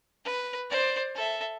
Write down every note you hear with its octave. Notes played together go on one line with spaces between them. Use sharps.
B4
C5 D5
A4 E5